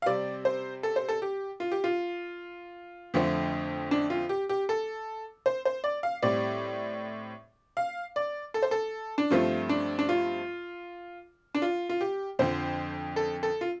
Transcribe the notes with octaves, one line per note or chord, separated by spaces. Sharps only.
F5
C3 G3 C4 D5
C5
A4
C5
A4
G4
F4
G4
F4
F2 D3 F3 A3 C4
D4
F4
G4
G4
A4
C5
C5
D5
F5
A2 G3 C4 D5
F5
D5
A4
C5
A4
D4
G2 F3 A3 C4 F4
D4
D4
F4
D4
F4
F4
G4
F2 D3 F3 C5
A4
A4
F4